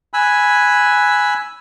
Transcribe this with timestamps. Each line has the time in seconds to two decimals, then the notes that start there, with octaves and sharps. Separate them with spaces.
0.14 G#5 B5 E6 F#6